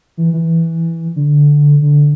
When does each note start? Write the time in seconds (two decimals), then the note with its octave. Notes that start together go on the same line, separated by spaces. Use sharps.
0.17 E3
0.33 E3
1.16 D3
1.82 D3